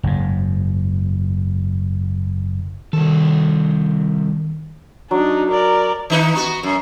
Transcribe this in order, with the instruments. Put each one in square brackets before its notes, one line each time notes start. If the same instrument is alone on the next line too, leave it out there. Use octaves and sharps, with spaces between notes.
[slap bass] F#1 G#2
[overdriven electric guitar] C2 A4 [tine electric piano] D#3
[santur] F#3 [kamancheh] D4 D#4
[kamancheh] A#4 D5
[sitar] D#3 D#4 B4
B3 F#4
F#2